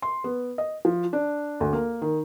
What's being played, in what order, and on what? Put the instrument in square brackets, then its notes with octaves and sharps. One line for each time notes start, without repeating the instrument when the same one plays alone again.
[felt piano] C6
B3
D#5
F3
D4
D2
A#3
D#3